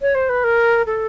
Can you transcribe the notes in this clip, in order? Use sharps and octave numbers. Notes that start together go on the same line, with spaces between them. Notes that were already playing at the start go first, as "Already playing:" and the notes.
C#5
C5
B4
A#4
A4